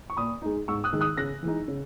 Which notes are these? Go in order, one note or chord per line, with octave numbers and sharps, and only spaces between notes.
C#6
A#2 B5 D#6
G#3 D#4
G#2 C#6 E6
D#6 F#6
D#3 G#3
D#6 F#6
C#3 F#6 A#6
E3 G#3 D#4
C#3